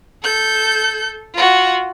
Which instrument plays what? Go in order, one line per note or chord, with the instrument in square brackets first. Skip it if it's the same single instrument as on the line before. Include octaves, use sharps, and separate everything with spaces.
[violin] A4 G6
F4 F#4